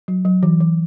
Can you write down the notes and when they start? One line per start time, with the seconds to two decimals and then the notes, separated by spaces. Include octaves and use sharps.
0.08 F#3
0.25 F#3
0.43 E3
0.60 E3